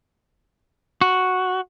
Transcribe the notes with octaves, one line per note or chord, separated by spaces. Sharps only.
F#4